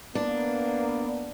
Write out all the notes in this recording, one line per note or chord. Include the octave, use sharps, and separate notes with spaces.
A#3 B3 D4